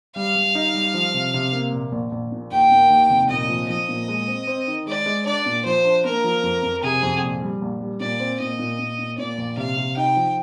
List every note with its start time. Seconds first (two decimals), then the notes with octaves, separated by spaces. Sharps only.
0.16 G3 F5
0.35 G3
0.55 D#4
0.74 G3
0.94 F3
1.14 C3
1.34 C3
1.53 A#3
1.72 A#1
1.92 A#1
2.12 A#1
2.32 A#2
2.51 D#2 G5
2.71 A#3
2.90 D#2
3.10 F1
3.29 A#2 D#5
3.49 F3
3.69 F3 D#5
3.88 A#2
4.08 G#3
4.27 C4
4.47 C4
4.67 D#3
4.87 G#3 D5
5.06 G#3
5.26 D4 D5
5.46 A#2
5.65 F3 C5
5.85 D4
6.04 A#3 A#4
6.24 F3
6.43 F2
6.63 F2
6.83 C3 G#4
7.03 F2
7.22 A#1
7.42 G3
7.61 A#1
7.81 G3
8.00 A#2 D5
8.20 C4
8.40 A#2 D#5
8.59 A#2
8.79 A#2
8.99 A#2
9.18 A#2 D5
9.38 A#1
9.57 C3 F5
9.77 C3
9.97 D#4 G5
10.16 F3